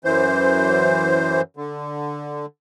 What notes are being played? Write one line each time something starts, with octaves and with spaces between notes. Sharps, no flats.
F#2 E3 C5
D3